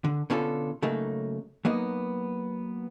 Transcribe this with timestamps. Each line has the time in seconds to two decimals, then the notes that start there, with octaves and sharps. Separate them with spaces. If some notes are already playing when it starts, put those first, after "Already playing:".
0.04 D3
0.30 B2 D3 C#4 F4 A4
0.82 C#3 F#3 A3 A#3 D#4
1.65 F#3 A#3 B3 D#4